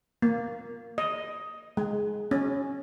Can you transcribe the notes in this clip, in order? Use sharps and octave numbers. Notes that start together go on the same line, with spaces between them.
A#3
D#5
G#3
C#4